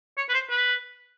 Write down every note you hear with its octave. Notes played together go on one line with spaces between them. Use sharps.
C#5
B4
C5
B4